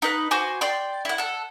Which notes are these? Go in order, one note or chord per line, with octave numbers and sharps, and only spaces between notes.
D#4 B4 F#6
F#4 C5 G#5 D6
D5 G5 C6
E4 F#5
A4 F#5